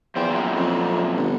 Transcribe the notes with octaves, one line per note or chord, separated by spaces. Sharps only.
E2 F3 C5 G5
F#2 A#2
F2
G1